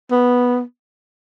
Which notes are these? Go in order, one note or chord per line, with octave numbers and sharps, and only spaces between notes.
B3